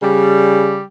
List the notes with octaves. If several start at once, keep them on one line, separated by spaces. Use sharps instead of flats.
C#3 G3